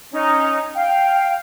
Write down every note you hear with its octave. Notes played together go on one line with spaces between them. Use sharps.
C#4 D#4
F5 G5